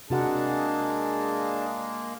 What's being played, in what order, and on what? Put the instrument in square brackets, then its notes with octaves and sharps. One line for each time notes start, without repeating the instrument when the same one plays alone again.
[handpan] C3 F#4 F#5 [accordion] G#3 A#3 [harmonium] D4 G#4 A5